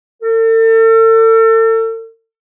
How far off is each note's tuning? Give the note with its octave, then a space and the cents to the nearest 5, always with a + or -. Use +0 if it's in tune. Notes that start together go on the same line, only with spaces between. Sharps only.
A4 +40